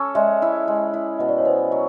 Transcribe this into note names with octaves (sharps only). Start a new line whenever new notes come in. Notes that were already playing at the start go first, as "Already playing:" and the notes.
Already playing: C#4 A4
G#3 D5 E5
E4
G#3
E4
B2 D#5
D5
C#5
B3 C5 D5
F#3